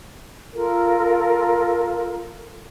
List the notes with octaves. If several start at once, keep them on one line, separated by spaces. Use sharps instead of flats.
F4 A4 A#4